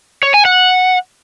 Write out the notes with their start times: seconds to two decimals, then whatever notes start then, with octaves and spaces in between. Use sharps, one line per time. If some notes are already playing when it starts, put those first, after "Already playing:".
0.23 C#5
0.34 G#5
0.45 F#5